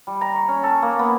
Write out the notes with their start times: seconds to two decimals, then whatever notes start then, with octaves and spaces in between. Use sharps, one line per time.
0.07 G3
0.21 A#5
0.35 C#6
0.48 C#4
0.63 A4
0.82 A#3
0.99 B3